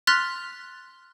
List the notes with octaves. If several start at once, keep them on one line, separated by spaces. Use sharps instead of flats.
C6 F6 F#6 A6 B6 F7